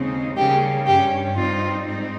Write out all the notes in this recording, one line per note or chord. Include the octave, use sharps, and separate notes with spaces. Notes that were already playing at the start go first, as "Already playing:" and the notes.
Already playing: D#2 C#3 G#3 C4 D#4
C#3 G3 A#3 C#4 G4
G2 G3 C#4 G4
G2 G3 C4 D#4 F4
G#2 G3 C4 D#4